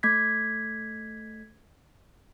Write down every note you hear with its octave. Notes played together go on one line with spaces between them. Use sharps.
A3 G#6 B6